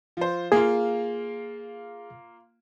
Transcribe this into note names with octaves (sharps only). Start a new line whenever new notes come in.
F3 C5
A#3 F4 G#4